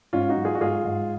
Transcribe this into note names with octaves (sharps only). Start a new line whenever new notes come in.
G#2 C#4 F4
D#4 F#4
F#3
F4 G#4
F#4
G#2 F4 G#4
G#2